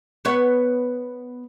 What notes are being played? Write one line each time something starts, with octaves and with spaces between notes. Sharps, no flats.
B3 B4 C#5